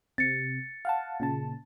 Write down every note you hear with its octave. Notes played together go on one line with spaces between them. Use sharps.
C3 A6 C#7
F5 F#5 A5
A#2 C#3 A5